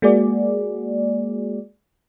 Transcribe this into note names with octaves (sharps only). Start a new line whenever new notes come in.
G#3 A#3 F#4 G#4 D5